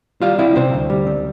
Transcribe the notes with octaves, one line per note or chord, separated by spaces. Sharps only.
G3 F4 F5
C4 E4 E5
C3 C4 C5
D2
G3
C4